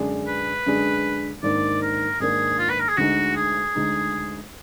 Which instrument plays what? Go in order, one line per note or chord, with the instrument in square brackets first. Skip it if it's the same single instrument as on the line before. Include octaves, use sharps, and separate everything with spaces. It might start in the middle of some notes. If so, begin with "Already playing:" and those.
Already playing: [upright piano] F#2 D3 G#3 D4 G#4
[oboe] B4
[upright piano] F#2 D3 G#3 D4 G#4
[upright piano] G#2 D#3 A#3 D4 [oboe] D5
[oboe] A#4
[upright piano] G#2 D#3 A#3 D4 [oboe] G#4
[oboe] F4
B4
A#4
G#4
[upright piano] D2 D3 G#3 D#4 [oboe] F#4
[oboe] G#4
[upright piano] D2 D3 G#3 D#4